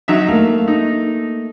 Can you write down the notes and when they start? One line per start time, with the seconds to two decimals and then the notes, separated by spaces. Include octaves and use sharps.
0.08 F#3 D#4 E5
0.28 A3 A#3 F5
0.68 D#4